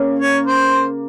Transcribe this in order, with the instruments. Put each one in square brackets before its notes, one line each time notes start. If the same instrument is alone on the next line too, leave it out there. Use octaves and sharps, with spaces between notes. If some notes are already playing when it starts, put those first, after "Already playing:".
Already playing: [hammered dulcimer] C#3 A#3
[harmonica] C#5
C5